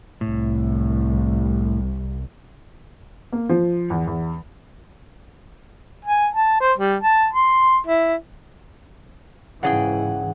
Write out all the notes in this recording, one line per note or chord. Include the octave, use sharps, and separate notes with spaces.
C2 A2
A#3
F3
E2
E2
G#5
A5
C5
G3
A5
C6
E4
G#2 C#3 E3 G#4 F#5 G5